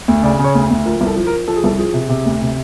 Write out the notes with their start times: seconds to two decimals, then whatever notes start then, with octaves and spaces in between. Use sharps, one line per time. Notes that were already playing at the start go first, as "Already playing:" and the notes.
0.08 D2
0.23 C#3 D5
0.39 C#3
0.44 C#5
0.55 D2
0.70 D2
0.85 F3 A#4
1.00 C2 A#4
1.07 A4
1.16 F3
1.27 A#4
1.32 F3
1.48 F3 A4
1.56 G#4
1.64 C2 A4
1.78 F3 G#4
1.94 C3
2.09 C3
2.26 D2
2.41 C3